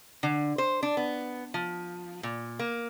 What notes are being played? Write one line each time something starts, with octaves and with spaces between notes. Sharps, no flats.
D3
C5
D4
B3
F3
A#2
A#3